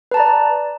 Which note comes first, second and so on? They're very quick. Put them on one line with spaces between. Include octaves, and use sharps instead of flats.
B4 A5 A#5 D5